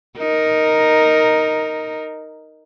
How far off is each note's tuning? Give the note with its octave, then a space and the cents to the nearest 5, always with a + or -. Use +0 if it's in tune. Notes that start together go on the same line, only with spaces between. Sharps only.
D#4 +0 A#4 +0